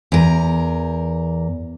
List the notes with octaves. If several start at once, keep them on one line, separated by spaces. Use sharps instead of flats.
E2 A#4